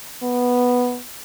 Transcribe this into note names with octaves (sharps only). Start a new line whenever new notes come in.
B3